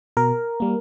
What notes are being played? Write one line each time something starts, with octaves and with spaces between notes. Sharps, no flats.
B2 A#4
G3 A#3